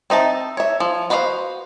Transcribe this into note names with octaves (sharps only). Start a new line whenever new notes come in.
C4 D#4 E5 A5
C#5 E5
F3
F#4 B4 C5 D#5 F5